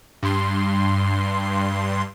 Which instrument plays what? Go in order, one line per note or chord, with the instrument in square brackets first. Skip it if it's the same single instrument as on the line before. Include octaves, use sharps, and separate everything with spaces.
[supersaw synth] G2 C6